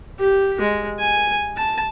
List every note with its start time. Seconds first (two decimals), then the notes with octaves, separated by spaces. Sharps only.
0.20 G4
0.61 G#3
0.99 G#5
1.57 A5